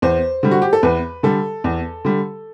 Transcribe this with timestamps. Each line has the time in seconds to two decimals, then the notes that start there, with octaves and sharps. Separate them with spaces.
0.02 E2 C5
0.43 D3 G3
0.51 F#4
0.62 G4
0.73 A4
0.83 E2 B4
1.23 D3 G3 A4
1.64 E2
2.05 D3 G3